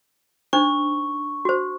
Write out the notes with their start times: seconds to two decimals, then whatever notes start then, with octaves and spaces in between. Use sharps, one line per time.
0.53 D4 D#4 C5 C#6
1.45 F#4 C5